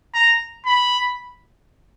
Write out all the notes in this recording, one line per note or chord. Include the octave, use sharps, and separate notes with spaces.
A#5
B5